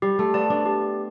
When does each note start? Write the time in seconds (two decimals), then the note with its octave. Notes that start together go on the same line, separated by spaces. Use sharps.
0.02 G3 G4
0.19 A3
0.34 B3 D5 A5
0.50 D4
0.66 G4